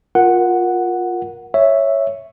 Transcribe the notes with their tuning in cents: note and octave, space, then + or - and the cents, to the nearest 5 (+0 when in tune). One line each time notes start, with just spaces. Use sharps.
F4 +15 A#4 +10 F#5 +0
C#5 +0 E5 +0